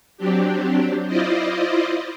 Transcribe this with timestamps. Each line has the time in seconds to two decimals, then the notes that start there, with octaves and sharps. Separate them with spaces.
0.17 F#3 C4 D4 G4
1.07 E4 F4 C5 D5 D#5